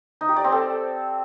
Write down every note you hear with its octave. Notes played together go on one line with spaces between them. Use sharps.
D#4
G4
D5
C4
A4